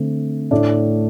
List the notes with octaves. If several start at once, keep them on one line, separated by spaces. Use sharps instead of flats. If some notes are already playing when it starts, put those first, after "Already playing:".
Already playing: D3 A3 C4
A2 A3 D4